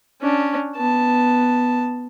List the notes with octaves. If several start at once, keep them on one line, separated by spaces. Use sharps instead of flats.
C#4 D4
B3 A5